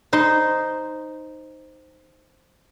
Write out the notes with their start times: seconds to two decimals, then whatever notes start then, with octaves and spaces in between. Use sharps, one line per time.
0.13 D#4 C5